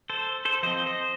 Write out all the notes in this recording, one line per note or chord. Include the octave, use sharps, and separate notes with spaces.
A4 C5
A4 C5
F3 C4 C5 D#5
C5 D#5